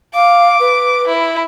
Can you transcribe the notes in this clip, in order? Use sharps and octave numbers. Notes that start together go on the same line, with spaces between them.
F5 D6
B4
E4